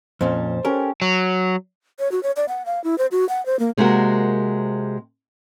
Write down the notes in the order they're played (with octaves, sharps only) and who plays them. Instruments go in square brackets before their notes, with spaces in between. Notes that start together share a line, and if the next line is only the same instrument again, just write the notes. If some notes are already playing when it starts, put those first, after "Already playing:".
[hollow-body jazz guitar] F2 A#2 C#4 [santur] C5 A5
[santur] C#4 G4 A4 [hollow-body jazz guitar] A#4
[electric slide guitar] F#3
[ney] C#5
F#4
C#5
D5
F#5
F5
E4
C5
F#4
F#5
C5
A#3
[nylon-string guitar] C3 G#3 A#3 C4 F#4 A#4